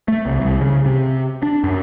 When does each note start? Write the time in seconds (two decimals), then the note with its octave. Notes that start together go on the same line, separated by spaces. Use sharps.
0.08 A3
0.25 C2
0.40 C2
0.61 C#3
0.86 C3
1.43 D4
1.64 F#2